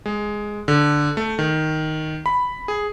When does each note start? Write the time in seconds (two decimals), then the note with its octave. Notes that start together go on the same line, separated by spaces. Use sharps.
0.06 G#3
0.68 D3
1.17 A3
1.39 D#3
2.26 B5
2.68 G#4